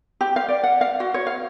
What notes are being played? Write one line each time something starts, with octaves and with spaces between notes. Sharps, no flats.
G4
F5
D5
F#5
F5
F#4
C#5
F5